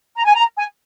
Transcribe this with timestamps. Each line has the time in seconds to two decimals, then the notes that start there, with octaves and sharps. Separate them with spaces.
0.16 A#5
0.25 G#5
0.35 A#5
0.57 G#5